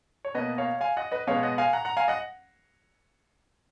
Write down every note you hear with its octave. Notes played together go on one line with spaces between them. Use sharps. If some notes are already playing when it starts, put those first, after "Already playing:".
C#5
B2 A#3 B4 D#5
C#5 F5
F5 G#5
D#5 F#5
B4 D#5
B2 G#3 B3 C#5 F5
D#5 F#5
F5 G#5
F#5 A#5
F#5 A#5
F5 G#5
D#5 F#5